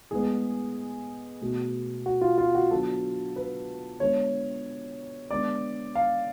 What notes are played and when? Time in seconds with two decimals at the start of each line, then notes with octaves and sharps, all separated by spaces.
0.11 A2 G#3 B3 G#4
1.42 B2 A3
2.06 F#4
2.21 F4
2.38 F4
2.55 F#4
2.71 D3 F#3 B3 A4
3.36 B4
4.00 D3 G#3 B3 C#5
5.30 D3 G#3 B3 D5
5.95 F5